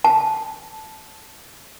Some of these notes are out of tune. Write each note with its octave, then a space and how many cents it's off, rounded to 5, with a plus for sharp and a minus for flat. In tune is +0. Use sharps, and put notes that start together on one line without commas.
A5 -10